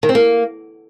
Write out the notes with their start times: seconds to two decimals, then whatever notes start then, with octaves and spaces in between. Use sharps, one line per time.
0.03 D#3
0.09 C4
0.15 A#3